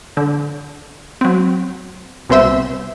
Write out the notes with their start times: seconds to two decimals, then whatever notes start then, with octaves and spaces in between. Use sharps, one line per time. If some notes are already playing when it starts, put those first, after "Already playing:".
0.17 D3
1.21 F#3 C4
2.30 C2 B2 C4 C5 E5 E6